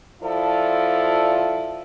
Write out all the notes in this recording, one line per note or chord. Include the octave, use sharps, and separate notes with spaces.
F3 E4 F4 A4 D5